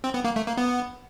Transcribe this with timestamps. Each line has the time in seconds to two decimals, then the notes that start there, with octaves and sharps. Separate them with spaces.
0.04 C4
0.14 B3
0.24 A#3
0.36 A3
0.47 A#3
0.57 B3